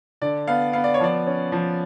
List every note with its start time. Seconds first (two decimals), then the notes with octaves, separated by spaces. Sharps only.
0.21 D3 D5
0.48 B3 F5
0.73 B3 F5
0.84 D5
0.94 C#5
1.00 F3 D5
1.27 C#4
1.52 F3